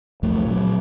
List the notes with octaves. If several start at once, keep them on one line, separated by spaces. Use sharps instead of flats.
C#2 F#2 F3 A3
A#2 F#3